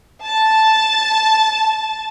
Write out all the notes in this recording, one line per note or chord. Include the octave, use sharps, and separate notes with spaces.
A5 A6